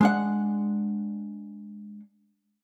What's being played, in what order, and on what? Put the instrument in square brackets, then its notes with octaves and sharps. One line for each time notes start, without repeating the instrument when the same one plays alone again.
[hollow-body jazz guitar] G#3 D4 F#5